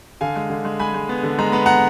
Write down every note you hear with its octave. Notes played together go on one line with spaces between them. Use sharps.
D3 F5 G#5
G#3
D3
G#3
G#3 G#5 B5
G#3
B3
D3
G#3 A#5
B3 B5
B3 F#5 A#5